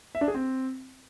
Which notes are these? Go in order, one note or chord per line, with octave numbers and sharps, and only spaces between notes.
E5
D4
G#4
C4